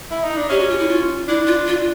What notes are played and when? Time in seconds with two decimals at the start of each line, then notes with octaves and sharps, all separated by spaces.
0.11 E4
0.24 D#4
0.37 D4
0.50 C#4 G4
0.60 F#4
0.70 F4
0.79 E4
0.89 F4
1.28 D4 E4
1.47 F4
1.67 F4